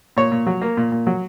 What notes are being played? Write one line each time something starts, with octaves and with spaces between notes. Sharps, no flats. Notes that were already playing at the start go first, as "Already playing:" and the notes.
A#2 C#5
A#2
F#3
A#3
A#2
A#2
F#3